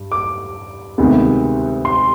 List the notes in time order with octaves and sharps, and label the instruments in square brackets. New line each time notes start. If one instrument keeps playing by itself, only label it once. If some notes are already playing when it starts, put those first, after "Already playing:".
Already playing: [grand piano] G2
D6
D2 C3 D#3 G#3 B3
C6